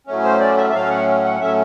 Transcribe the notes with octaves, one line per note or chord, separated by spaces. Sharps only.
A2 F#3 A3 C#4
C5
D5
E5
E5
A2 F#3 A3 C#4 F5
F#5
F#5
A2 F#3 A3 C#4 E5